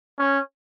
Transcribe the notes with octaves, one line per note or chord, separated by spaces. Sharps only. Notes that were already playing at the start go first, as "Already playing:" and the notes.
C#4